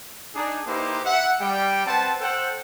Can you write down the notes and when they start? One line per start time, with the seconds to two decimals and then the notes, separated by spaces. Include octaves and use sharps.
0.35 D4 D#4 G#4
0.66 A#3 D#4 E4 G4 B4 C5
1.04 E5 F#5
1.40 G3 G5
1.86 C4 B4 C5 F#5 A5
2.21 A4 C5 F#5 G5